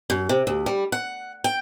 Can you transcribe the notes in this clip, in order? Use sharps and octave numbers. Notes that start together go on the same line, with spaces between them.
F#2
C3
D2
G3
F#5
G5